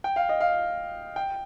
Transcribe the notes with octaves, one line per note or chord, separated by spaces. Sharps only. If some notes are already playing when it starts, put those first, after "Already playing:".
G5
F5
D#5
F5
G5